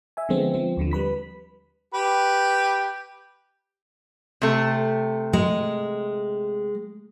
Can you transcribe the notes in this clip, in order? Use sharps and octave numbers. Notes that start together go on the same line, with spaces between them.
E5 G#5
D3 F3 G#3 B3 C4
F3 C4
D#2 D3 F3
G3 B4 B5 B6
G4 B4
C3 A3
G#3